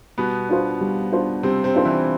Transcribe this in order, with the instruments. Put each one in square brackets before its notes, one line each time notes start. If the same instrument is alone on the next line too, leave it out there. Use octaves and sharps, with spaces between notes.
[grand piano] B2 B3 [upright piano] G3
[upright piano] D4 F4 C5
G3
D4 F4 C5
[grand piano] C3 C4 [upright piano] G3
[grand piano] C3 C4
[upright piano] D4 F4 C5
[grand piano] E3 E4